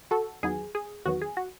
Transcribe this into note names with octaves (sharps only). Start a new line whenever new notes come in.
F#4 A4
E2 D#3 F#3 B3 G#4
G#4
E2 D#3 F#3 B3 F#4
G#4
F#4